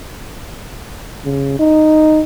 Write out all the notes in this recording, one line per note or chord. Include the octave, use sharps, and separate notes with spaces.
C#3
D#4